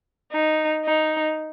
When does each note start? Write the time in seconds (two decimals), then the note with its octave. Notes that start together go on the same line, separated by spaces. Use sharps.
0.32 D#4
0.84 D#4